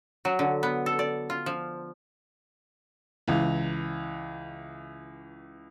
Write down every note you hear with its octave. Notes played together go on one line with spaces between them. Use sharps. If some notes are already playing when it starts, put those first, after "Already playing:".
F#3
D3
B3
A4
D5
F4
F3
C#2 E3